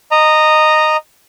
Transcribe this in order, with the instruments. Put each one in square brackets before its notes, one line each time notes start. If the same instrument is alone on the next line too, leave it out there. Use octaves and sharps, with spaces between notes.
[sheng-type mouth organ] D#5 A#5